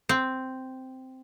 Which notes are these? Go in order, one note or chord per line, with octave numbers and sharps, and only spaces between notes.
C4